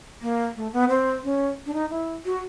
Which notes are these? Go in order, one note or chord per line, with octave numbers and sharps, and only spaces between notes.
A#3
A3
B3
C4
C#4
D4
D#4
E4
F#4